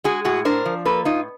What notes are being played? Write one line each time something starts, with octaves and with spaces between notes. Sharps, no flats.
G#3 F#4 G#4
A2 F#4 G#4
D4 A#4 C5
F3
A#3 A4 B4
A2 D#4 F4